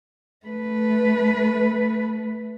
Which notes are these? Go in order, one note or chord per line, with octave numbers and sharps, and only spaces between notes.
A3 B4